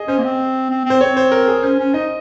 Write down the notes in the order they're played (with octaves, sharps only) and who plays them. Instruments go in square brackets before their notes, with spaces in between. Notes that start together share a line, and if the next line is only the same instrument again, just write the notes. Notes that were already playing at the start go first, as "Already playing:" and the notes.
Already playing: [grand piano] G#4 D#5
[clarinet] C#4 [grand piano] C5
[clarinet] A#3
C4
C4
C4
[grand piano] C5
[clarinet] C4 [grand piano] C#5
[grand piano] C5
A#4
G#4
[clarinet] C#4 [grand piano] C5
[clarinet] C#4
[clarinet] D#4 [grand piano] D#5